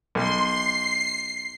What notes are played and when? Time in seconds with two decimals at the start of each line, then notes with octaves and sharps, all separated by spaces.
0.15 B1 C6
0.45 C7